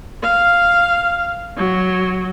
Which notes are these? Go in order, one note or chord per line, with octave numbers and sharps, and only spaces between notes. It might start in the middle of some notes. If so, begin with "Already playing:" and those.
F5
F#3